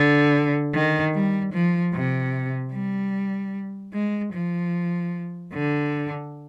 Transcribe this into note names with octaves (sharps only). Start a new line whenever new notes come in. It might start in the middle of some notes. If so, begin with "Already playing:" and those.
Already playing: D3
D#3
G3
F3
C3
G3
G#3
F3
D3